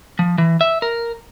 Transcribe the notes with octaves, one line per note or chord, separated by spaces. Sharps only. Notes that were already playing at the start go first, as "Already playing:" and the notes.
F3
E3
E5
A#4